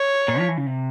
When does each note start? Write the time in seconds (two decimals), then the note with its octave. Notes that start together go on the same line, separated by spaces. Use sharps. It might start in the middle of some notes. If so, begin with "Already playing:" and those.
Already playing: C#5
0.28 A#2
0.39 F3
0.48 E3
0.57 C#3
0.66 C3